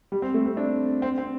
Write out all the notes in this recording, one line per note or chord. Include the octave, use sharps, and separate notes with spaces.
G3
C4
A3
C4
D4
C4
C4